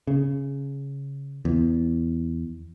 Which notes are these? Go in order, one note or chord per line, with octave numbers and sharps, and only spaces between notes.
C#3
E2